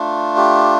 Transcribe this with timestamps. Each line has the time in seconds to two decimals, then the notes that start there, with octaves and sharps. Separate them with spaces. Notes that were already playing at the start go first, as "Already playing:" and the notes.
Already playing: A3 D4 F4
0.37 G4